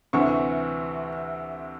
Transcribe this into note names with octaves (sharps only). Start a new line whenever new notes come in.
D2 C3 E3 C#6